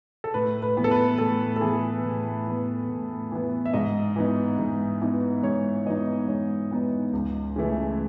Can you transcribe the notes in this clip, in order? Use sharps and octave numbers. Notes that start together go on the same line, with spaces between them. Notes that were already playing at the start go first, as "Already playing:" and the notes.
A4
A2 B4
B4
E3 B3
A4
B4
A2 A4
A4
E3 B3 G#4
A2
E3 B3
A2
E3 B3
E5
G#2 D#5
E3 B3 D#4
G#2
E3 B3 D#4
G#2 C#5
E3 B3 D#4 D#5
G#2 C#5
E3 B3 D#4
C#2
C#3 E3 A3